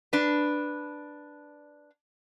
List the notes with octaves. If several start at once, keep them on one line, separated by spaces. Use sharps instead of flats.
D4 B4